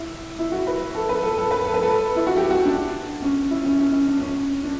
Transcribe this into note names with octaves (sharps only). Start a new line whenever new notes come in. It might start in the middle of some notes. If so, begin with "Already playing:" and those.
Already playing: E4
E4
F#4
B4
A4
B4
A4
A4
B4
A4
B4
A4
E4
F#4
G4
F#4
D4
C#4
E4
C#4
C#4
C#4
D4
C#4
D4